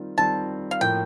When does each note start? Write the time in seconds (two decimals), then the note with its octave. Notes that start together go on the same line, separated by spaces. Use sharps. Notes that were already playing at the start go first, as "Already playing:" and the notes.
Already playing: D#3 G3 C4 F4
0.17 D#3 G3 C4 F4 A5
0.71 F5
0.80 A2 F3 A#3 G5